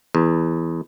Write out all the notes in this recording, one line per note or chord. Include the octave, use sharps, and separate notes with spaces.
E2